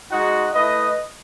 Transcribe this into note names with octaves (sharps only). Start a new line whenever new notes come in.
G#3 D#4 F#4 D#5 F#5
A3 E4 B4 D#5